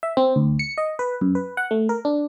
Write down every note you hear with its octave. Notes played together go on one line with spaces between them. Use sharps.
E5
C4
D2
C#7
D#5
B4
F#2
B4
F#5
A3
A#4
D4